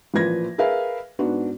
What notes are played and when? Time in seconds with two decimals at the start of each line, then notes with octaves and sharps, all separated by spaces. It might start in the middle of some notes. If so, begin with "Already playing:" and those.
0.14 A1 A#2 F3 B4 G#6 A#6
0.58 G#4 A#4 B4 E5 F5
1.19 G#2 B3 D4 F#4